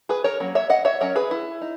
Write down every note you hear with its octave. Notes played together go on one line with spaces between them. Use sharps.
G#4 B4
A#4 C#5
F#3 A#3 C#4
C#5 E5
D#5 F#5
C#5 E5
F#3 C#4 A#4 C#5
G#4 B4
E4
D#4